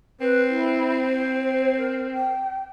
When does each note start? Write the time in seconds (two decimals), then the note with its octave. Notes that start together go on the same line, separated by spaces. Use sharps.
0.21 C4 B4
0.49 E4
1.05 C5
1.78 A#4
2.13 G5